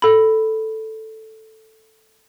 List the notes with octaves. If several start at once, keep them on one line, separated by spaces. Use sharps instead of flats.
A4 B5